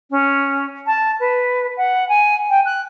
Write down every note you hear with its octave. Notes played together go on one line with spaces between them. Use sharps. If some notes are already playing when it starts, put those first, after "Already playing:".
C#4
A5
B4
F#5
G#5
G5
F#6